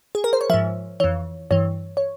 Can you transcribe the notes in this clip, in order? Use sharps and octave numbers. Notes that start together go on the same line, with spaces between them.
G#4
A#4
C5
C#5
G#2 F3 E5
F2 E3 C#5
G2 E3 C#5
C#5